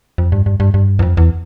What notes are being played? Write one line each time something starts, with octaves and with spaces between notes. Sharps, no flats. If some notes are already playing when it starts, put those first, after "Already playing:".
F2
G2
G2
G2
G2
E2
F2
E2